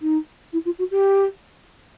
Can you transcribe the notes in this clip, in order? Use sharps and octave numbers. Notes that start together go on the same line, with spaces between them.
D#4
E4
F4
F#4
G4